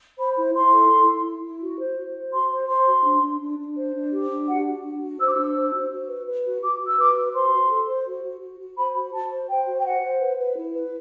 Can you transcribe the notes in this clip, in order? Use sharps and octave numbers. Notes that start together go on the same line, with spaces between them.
C5 B5
E4
E4 C6
A4
E4
E4
E4
E4
F#4
C5
F#4
C5
F#4 C6
C5
C5 C6
F#4
D4
D4
D4
D4
C5
D4
G4
D4
F#4 F#5
F#4
D4
F#4
C5 E6
D6
D4 E6
C5
F#4
F#4
B4
B4
F#4
F#4 D6
F#4
E6
B4 D6
F#4
C5 C6
F#4
A4
C5
F#4
F#4
F#4
F#4
C5 B5
F#4
F#4 A5
C5
C5 G5
F#4
G5
C5 F#5
C5
B4
B4
E4
B4